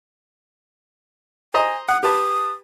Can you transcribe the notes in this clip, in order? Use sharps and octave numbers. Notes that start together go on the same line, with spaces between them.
C5 D#5 G#5 A#5
F#5 D#6
G4 B4 A5 D#6